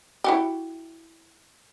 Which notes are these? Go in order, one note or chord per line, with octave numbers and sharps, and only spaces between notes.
E4 F#4 G4